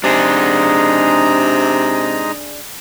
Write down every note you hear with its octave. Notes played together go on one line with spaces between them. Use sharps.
C3 G#3 D4 D#4 G#4 A#5